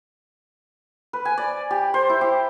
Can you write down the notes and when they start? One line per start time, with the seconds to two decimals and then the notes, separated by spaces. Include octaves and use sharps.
1.13 B4
1.25 G#5
1.38 D5
1.71 G4
1.94 C5
2.09 E4
2.21 G4